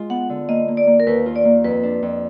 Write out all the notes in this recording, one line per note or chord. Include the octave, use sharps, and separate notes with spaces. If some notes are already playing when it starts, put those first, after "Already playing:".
Already playing: G#3 F4
B3 F#5
D3
A#3 D#5
A#3
D5
A#3
A#4
D#2 B4
F4
D5
A#3
F2 B4
D4
F2